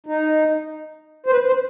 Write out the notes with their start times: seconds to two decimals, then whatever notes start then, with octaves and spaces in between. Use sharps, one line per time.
0.06 D#4
1.26 C5
1.32 B4
1.47 C5